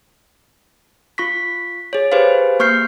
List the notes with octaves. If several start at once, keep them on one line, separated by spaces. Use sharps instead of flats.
F4 C#6 B6
G#4 C#5
G4 G#4 B4 C5 F5
A#3 C#6 F6 G6 C7